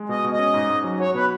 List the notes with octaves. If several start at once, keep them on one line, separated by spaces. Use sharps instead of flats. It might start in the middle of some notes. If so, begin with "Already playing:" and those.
Already playing: G#3
B2 D#5
B2
D#5
C#4
G#2
G#2
F#3
F#4 C#5
B2 B4